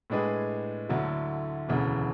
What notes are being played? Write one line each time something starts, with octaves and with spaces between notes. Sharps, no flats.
A2 G#3 D4 G#4 B4
D2 D3 F#3 A3 E4
E1 D2 C#3 E3